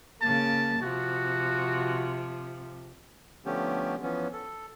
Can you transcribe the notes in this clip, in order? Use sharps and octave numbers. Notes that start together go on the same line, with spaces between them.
C#3 A#3 A5
C3 F3 F#4
D3 F3 A3 B3 C#4 G4
E3 F3 B3 C#4
A4